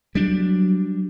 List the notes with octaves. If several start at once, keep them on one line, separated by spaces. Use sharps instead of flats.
F#3 G3 D4